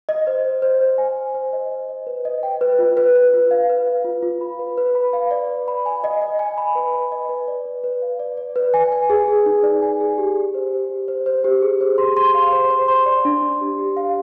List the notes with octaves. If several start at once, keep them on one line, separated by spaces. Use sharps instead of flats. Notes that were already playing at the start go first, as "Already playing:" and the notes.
D#5
C5
C5
C5
C5
G#5
G#5
C5
D#5
D#5
D#5
B4
D#5
G5
B4
F4
B4
B4
F4
F5
B4
F5
F4
F4
B5
B4
B4
B5
F5
D5
B4
B5
G#5
D#5
D#5
G#5
B5
B4
B5
D#5
B4
D5
B4
B4
F5
D5
D5
B4
G#5
G#5
G#4
G#4
D#4
D5
G#5
G#4
G4
G4
C5
G4
G4
C5
C5
G4
G#4
C5
C6
C6
F5
C5
C5
C6
D5
D4
D4
G4
G4
F5